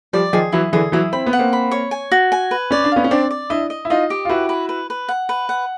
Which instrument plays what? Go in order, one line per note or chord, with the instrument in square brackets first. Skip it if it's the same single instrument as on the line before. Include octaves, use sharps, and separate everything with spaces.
[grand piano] F3 G3 [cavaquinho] D5
[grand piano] D#3 F3 [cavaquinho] G#4
[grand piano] E3 F#3 [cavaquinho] E4
[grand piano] D3 E3 [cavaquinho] G#4
[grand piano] E3 F#3 [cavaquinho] E4
[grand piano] C4 [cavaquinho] B5
[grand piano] B3
[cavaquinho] F#5
[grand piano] A#3 C4
[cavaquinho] B5
C#5
G#5
F#4
G#5
B4
[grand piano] C#4 [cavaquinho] D5
[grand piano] D4
[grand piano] B3 C#4 [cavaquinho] F5
[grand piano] C#4
[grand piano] C4 D4 [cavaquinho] D5
[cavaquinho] D5
[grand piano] D4 E4 [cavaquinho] D#5
[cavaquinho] D#5
[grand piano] E4
[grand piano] D#4 F4 [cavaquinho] D#5
[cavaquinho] G4
[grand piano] F4
[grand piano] E4 F#4 [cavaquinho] B4
[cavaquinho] B4
B4
B4
F#5
B4
F#5